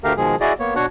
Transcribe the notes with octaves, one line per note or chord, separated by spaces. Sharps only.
D2 D3 A3 G4 A#4 F5
B2 D#3 F3 G#3 G#4
E4 F#4 G#4 D5 D#5
A#3 B3 C#5
B2 D4 F#4 C#5 F#5